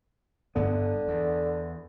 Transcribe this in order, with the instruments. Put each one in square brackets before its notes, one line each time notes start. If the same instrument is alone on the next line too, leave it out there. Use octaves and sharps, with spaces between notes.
[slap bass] G1 G2 B3 [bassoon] D3
[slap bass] E2